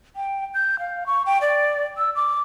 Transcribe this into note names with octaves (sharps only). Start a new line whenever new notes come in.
G5
G6
F5
C#6
G5
D5
E6
D6